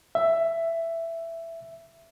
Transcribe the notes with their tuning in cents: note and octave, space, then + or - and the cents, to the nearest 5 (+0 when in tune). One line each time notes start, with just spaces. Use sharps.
E5 +10